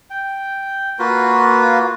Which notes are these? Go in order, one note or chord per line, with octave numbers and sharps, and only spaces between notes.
G5
A#3 F4 F#4 B4